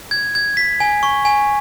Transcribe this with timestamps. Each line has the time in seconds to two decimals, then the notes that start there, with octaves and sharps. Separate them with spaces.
0.11 G#6
0.35 G#6
0.57 B6
0.80 G#5
1.03 C#6
1.25 G#5